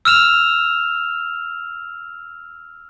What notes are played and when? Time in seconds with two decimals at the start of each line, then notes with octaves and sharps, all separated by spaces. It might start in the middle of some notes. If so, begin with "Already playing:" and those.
0.05 E6 F6 E7 F7